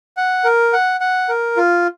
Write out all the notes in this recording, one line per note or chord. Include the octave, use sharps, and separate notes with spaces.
F#5
A#4
F#5
F#5
A#4
F4